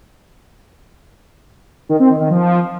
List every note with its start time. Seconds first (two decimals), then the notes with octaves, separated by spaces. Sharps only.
1.89 D#3
2.00 C4
2.10 D#3
2.20 D#3
2.30 F3